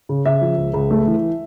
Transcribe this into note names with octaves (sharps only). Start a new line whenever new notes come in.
C#3
C#3 E5
F3
C#2
C#2
A3
E3